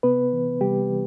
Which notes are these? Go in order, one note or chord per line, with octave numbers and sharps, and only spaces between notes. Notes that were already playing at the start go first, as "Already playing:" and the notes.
C3 B3 B4
E3
C3 G3 G4
E3